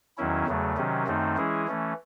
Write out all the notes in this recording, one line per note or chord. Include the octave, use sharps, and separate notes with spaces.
E2 D#3 F#3 C#4 E4
E2 C#3 F#3 A3
C3 D#3 F#3 C#4
F#2 D#3 A3 C4 D#4
E3 G#3 C#4 E4 G#4
E3 A3 C#4